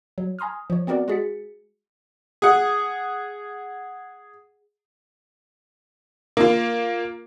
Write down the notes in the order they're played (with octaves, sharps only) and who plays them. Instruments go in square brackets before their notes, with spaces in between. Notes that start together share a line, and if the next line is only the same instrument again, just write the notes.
[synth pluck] F#3
G#5 A#5 C6 D#6 F6
F3 C#5
B3 C4 F#4 A#4 D5 F#5
G#3 F#4 G#4 A6 B6 C#7
[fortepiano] G#4 F#5
[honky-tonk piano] A#3 F4